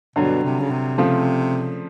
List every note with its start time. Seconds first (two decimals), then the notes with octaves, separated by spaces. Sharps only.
0.16 G2 B2 D3 F#3
0.43 C3
0.60 C#3
0.71 C3
0.98 C#3 F3 A3 C4 F4